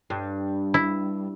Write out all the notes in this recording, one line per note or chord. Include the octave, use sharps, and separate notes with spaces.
G2
E4